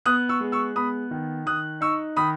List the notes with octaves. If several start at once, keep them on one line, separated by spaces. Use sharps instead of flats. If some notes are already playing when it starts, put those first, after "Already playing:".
B3 D#6 F#6
C#6 E6
G#3
C#6 E6
B3 B5 D#6
D#3
D#3 D#6 F#6
D#4 C#6 E6
D#3 B5 D#6